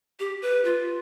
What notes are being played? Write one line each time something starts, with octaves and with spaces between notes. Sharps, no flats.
G4
B4
F4